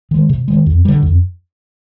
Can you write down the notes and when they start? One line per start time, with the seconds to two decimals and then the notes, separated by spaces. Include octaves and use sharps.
0.11 D#3 G#3
0.29 C3
0.48 D#3 G#3
0.66 F2
0.85 D3 G3
1.03 F2